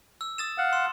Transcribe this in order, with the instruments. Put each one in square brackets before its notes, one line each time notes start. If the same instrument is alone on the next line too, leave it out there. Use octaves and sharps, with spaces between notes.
[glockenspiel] E6
D#6 A6 E7
[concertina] F5 F#5
[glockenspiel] C6 E7